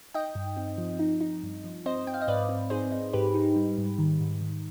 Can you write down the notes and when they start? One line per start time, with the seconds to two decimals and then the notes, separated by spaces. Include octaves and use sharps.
0.14 D#4 D#5 G5
0.35 G2
0.57 C4
0.78 F3
0.99 D#4
1.21 D#4
1.43 G2
1.64 F3
1.86 C4 C5 D#5
2.07 C4 G5
2.14 F5
2.21 D#5
2.28 G#2 B4 D5
2.49 C4
2.70 D#4 G#4 C5
2.91 D#4
3.13 G#2 G4 B4
3.34 D#4
3.56 G3
3.78 G#2
3.98 D#3
4.20 G#2
4.42 D#3